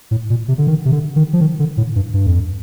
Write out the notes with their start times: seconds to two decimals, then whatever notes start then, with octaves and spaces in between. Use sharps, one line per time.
0.11 A2
0.30 A#2
0.48 C3
0.58 D3
0.67 D#3
0.85 C3
0.92 D3
1.16 D#3
1.33 F3
1.41 D#3
1.59 D3
1.77 A2
1.96 G2
2.14 G2
2.27 F2